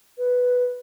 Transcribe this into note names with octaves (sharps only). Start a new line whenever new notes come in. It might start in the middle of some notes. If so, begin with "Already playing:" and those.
B4